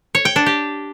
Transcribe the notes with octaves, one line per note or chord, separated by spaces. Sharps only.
C#5
G5
D4
G4